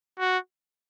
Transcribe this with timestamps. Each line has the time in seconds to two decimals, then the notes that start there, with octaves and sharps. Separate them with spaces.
0.19 F#4